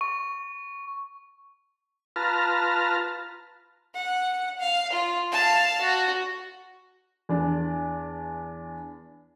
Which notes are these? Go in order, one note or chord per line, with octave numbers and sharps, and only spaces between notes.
C#6
F4 B4 A5 A#5 F6
F#5
F5
F4
F5 A5
F#4
E2 D4